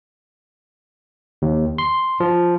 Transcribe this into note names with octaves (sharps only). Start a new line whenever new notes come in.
D#2
C6
F3